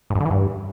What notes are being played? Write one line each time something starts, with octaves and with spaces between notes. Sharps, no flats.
G#2
F#2
D3
E3
G2